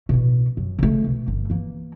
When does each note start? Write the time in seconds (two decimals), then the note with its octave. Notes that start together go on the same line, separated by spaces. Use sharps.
0.09 A1 B2
0.57 F#2
0.79 C#3 A3
1.06 B2
1.28 G1
1.50 E3 A#3